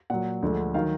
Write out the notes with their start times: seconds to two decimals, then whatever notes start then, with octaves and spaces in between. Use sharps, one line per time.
0.10 A#2 F#3 F#5
0.42 D2 D3 F3 G#3
0.74 D#3 F#3 F5